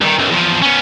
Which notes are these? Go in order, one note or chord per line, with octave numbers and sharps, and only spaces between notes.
G2 D#3
B1 F#2
E2 F3
B3 C#4